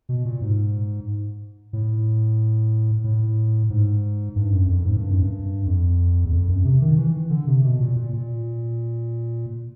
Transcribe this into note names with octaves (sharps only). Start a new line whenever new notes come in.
B2
A#2
G#2
A2
A2
G#2
G2
F#2
F2
G#2
G2
F#2
G2
F2
E2
F2
F#2
C3
D#3
E3
D3
C3
B2
A#2
A#2
A#2